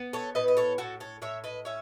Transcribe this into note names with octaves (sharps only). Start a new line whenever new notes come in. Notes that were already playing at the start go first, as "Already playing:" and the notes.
Already playing: B3
A4 C#5
A2 B4 D#5
D#5
A4 C#5
A2 F#4 A4
A4 C#5
A2 C#5 E5
B4 D#5
C#4 C#5 E5